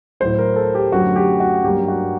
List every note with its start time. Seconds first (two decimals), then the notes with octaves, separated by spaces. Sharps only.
0.20 A2 F#3 A3 C5
0.38 A#4
0.56 A4
0.75 G4
0.92 F#2 D3 F#3 A3 F#4
1.16 G4
1.40 F#4
1.63 G2 F#3 A#3 G4
1.88 F#4